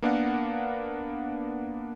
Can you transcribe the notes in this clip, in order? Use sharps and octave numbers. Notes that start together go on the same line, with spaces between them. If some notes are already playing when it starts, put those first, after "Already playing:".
A#3 B3 D4 A#4 F5 F#5